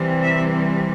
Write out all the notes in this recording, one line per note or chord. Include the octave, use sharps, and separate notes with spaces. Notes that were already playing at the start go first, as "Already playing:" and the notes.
Already playing: C3 E3 G3 C4
E5